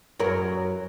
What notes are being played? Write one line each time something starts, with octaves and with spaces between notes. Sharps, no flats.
F#2 F#3 A#4